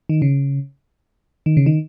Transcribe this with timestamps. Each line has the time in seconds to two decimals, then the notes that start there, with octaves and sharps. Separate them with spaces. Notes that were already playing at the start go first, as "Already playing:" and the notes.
0.09 D#3
0.22 C#3
1.46 D#3
1.57 C#3
1.66 D#3